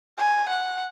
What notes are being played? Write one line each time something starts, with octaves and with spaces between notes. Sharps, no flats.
G#5
F#5